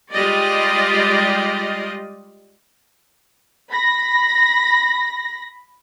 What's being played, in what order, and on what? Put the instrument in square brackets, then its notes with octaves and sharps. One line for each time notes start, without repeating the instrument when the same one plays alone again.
[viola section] G3 G#3 F4 G4 D5 D#5
[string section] B5 A#6